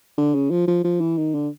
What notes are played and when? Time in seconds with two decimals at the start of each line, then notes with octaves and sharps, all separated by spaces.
0.17 D3
0.35 C#3
0.51 F3
0.68 F3
0.84 F3
1.00 E3
1.17 D#3
1.34 D3